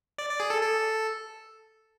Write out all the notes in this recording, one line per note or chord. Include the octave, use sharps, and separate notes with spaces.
D5
D5
G#4
A4
A4